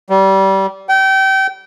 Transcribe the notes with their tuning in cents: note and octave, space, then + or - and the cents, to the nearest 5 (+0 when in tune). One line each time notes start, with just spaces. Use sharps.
G3 -25
G5 -30